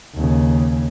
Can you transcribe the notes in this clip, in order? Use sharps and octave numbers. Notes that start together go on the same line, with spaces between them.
D#2 C#3